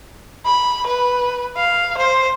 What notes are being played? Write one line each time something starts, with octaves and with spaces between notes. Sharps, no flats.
B5
B4
F5
C5